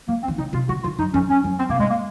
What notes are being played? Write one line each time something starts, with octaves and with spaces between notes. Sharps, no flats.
G#3 A#3
C4
D#3
C#3 D#4
C3 F4
C#3 F#4
D#3 F4
F#2 D#4
F2 C#4
F#2 C#4
F#2
C4
C3 A#3
G#2 G#3
A#3